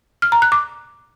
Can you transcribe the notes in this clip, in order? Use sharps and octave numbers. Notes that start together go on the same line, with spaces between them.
F6
A#5
F#6
D6